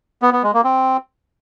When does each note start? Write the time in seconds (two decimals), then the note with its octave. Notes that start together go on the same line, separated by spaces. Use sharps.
0.22 B3
0.33 B3
0.43 G#3
0.54 A#3
0.64 C4